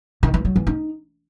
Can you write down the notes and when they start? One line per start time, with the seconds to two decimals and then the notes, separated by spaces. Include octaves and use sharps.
0.23 D#3
0.34 E3
0.45 F#3
0.56 E3
0.67 D#4